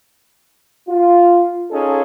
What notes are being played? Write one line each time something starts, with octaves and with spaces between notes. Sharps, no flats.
F4
C#4 D#4 F4 G#4 A4